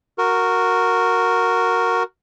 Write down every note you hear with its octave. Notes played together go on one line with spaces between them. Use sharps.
F#4 A#4